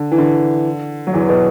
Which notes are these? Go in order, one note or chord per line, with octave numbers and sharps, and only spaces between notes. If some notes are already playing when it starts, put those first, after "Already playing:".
Already playing: D3
E3
D3
F#3
E2 E3
B2